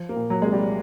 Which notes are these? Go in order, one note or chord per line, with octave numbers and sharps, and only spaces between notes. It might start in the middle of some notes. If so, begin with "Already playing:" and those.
Already playing: F3
A#3
A#2
F#3
C2 G#3
G3